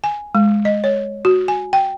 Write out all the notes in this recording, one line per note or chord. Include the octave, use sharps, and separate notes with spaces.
G#5
G#3
D#5
C#5
F#4
G#5
G5